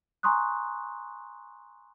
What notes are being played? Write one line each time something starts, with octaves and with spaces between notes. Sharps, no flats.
G#5 A#5 C6 C#6 D#6 F#6